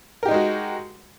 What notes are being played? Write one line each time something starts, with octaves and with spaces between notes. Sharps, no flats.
G#3 D#4 F#4 G4 A#4